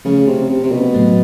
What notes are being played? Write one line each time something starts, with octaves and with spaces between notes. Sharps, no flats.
C#3 F3 A3 C#4
C3
C3
C3
B2
A2 F#3 A3